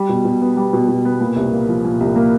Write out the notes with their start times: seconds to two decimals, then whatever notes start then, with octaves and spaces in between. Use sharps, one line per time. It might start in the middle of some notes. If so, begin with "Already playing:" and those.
Already playing: G3
0.09 B2
0.25 B2
0.42 B3
0.57 G3
0.73 B2
0.88 B2
1.05 B3
1.20 A#2
1.36 C2
1.53 A#3
1.68 F3
1.85 A#2
2.00 C2
2.16 A#3